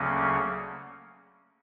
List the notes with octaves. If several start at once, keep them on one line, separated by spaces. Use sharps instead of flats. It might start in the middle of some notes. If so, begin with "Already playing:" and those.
Already playing: D2 C#3 F#3 A#3 C#4